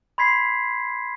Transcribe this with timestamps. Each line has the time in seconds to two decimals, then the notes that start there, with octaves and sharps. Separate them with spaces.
0.18 B5 C6 G#6 B6 C7